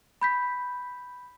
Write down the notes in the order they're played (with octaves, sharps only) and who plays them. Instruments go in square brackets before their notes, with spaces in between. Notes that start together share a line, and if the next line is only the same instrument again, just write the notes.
[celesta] B5 G6 B6